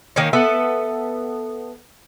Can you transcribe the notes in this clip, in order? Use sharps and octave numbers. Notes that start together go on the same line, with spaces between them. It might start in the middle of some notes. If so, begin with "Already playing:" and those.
D#3 A#3 C#4 D#4
B3 A4 E5